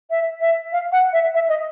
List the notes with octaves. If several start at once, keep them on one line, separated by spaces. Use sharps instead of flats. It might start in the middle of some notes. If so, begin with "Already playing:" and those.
E5
E5
F5
F#5
E5
E5
D#5